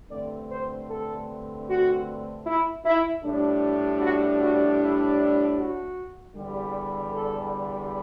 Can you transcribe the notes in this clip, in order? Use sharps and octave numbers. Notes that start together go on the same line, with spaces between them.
G2 D3 A3 C4 D5
C5
A4
F#4
E4
E4
A2 G3 D4
F#4
F#4
E4
E4
F#4
E2 D3 G3
A4